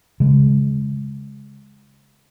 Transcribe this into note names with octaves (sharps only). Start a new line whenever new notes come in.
C#3 G#3